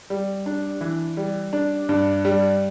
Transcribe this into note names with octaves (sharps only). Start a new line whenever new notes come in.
G3
D4
E3
G3
D4
G2
G3